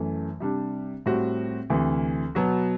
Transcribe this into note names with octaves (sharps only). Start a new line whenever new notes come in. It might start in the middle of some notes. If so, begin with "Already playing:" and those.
Already playing: F#2 E3 A3
C3 G3 D4
A2 G3 C4 F#4
D2 C3 E3
B2 F#3 B3 F#4